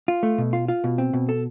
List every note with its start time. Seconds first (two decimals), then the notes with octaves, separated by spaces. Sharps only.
0.08 F4
0.23 A3
0.38 B2
0.53 F4
0.68 F4
0.84 B2
0.98 C4
1.13 B2
1.29 A4